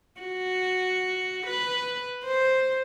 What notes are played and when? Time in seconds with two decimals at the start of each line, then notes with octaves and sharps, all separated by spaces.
0.20 F#4
1.46 B4
2.24 C5